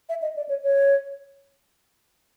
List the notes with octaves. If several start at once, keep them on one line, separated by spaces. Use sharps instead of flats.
E5
D#5
D5
C#5
C#5